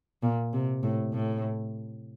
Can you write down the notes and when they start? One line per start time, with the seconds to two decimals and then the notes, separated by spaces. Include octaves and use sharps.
0.23 A#2
0.53 C3
0.83 A2
1.13 A2